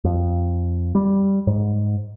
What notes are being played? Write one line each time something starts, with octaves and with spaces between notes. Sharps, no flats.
F2
G3
G#2